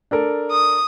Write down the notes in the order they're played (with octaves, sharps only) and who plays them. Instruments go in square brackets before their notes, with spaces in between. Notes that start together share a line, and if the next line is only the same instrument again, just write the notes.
[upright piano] D4 A4 A#4
[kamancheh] D#6